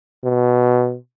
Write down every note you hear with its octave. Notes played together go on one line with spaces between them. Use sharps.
B2